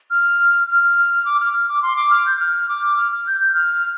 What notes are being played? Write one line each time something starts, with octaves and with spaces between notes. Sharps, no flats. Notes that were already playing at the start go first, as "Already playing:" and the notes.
F6
F6
D6
F6
F6
D6
C6
D6
F6
G6
F6
D6
F6
F6
G6
G6
F6